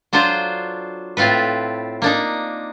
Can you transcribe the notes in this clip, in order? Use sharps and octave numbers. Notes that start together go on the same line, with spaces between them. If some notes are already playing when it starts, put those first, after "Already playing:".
F#3 D4 F4 A4 C5
A2 C4 F4 A4 B4
A#3 D4 D#4